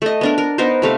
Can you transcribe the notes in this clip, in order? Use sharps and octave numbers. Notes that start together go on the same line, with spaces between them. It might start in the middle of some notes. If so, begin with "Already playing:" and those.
A3 D#5
B3 D4 A#4
A#4
B3 D#4 A#4 C5
C3 A3 F5